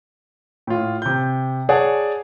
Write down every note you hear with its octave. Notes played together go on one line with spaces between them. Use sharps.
A2 F4
C3 G6
G#4 C#5 D5 F#5 G#5 A5